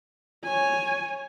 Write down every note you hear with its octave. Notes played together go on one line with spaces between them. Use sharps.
C#5 G#5